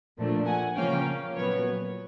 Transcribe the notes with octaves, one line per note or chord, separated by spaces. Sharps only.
A#2 F3 A3 D4
F#5 G#5
C#3 F3 A#3 C#4 F5 G5
A#2 F#3 B3 B4 C#5